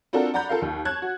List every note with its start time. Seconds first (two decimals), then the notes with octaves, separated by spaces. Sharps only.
0.13 C4 D4 F4 F#4 A4 A#4
0.34 D5 F#5 A#5 B5 G6
0.49 F4 A4 A#4 F5
0.62 D#2
0.85 C#5 A5 F#6 G#6
1.02 F#4